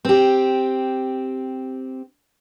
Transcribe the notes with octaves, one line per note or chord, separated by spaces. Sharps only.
C4 G4